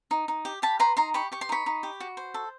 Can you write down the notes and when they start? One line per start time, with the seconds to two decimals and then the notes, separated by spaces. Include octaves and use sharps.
0.11 D#4
0.28 D#4
0.45 G4
0.62 G4 A5 B5
0.80 B4 A#5 C6
0.97 D#4 A#5 C6
1.14 G4 B5 C#6
1.32 G4 C#6
1.41 C6
1.49 D#4 B5 C#6
1.66 D#4
1.83 G4
2.00 F#4
2.17 C5
2.34 A4